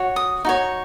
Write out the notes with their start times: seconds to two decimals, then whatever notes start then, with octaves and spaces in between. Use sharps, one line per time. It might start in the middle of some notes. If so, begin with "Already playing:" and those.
Already playing: F#4 C#5
0.16 D#6
0.45 D#4 F#4 C#5